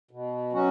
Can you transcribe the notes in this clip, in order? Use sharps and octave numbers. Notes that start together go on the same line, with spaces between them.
B2
F#3 C#4 F#4